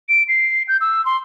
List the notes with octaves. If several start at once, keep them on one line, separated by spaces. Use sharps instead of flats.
D7
C7
G6
E6
C6